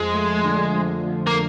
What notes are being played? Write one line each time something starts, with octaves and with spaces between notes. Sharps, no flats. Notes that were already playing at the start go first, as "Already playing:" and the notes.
Already playing: F2 F3 G#3
A3
D3
F2
F3
A#3